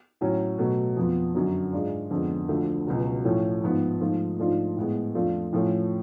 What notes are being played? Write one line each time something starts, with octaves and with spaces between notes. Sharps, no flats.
A2 F#3 C#4
B2 F#3 A3
F2 F3 B3
F#2 D3 F#3
G#2 G#3 D4 F4
F2 D3 G#3 B3
D2 D3 F3 A3
C#2 B2 F#3
A2 F3 A3 C#4
G#2 F3 B3
G#2 F3 A3 F4
G#2 F3 A3 D4 F4
A2 G#3 B3
F2 F3 A3 D4 F4
A2 F3 A3 C#4